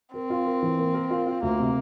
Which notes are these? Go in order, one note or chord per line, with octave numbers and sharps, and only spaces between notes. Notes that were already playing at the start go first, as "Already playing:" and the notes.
C4 A#4
F4
A#4
E3
A#3
A#4
F4
F4
D2 A#3
C3